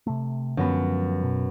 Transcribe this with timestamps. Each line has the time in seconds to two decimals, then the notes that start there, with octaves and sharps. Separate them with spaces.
0.07 C3 A3
0.57 F#2 D3 F3 G#3 B3 A#6
1.23 B2